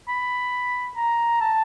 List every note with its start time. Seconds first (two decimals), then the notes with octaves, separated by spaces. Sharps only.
0.08 B5
0.96 A#5
1.41 A5